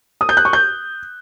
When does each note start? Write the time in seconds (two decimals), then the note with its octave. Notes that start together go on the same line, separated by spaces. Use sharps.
0.21 D#6
0.29 G6
0.37 F#6
0.45 C#6
0.53 G6